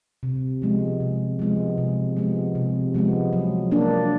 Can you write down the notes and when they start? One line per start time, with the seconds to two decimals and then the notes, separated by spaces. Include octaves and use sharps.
0.23 C3
0.62 F3 G#3 B3
1.00 C3
1.39 F3 G#3 B3
1.78 C3
2.17 F3 G#3 B3
2.55 C3
2.94 F3 G#3 B3
3.33 F#3
3.71 A#3 D4